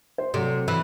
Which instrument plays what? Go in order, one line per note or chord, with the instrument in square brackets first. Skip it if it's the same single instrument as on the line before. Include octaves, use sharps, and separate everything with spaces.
[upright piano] C5
[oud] C3 [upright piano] F#3 A3
[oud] E3